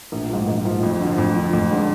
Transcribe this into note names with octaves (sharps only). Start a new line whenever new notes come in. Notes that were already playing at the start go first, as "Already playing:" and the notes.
A#1
G#2 F3
A#1
G#2 F3
F2
D3 F3
F2
D3 F3
F2
D3 G#3 D4